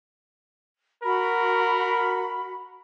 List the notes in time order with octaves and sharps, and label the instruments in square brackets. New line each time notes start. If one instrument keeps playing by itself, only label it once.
[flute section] F#4 B5 [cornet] A#4